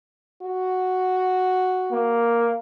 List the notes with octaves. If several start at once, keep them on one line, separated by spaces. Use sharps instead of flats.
F#4
A#3